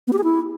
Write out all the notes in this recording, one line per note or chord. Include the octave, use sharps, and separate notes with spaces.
B3
G4
G#4
E4